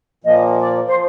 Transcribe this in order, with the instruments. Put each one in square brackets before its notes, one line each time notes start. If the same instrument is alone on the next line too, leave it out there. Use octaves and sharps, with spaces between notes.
[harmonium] A#2 F3 A#3 [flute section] D#5
[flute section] D5
C5
[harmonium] F3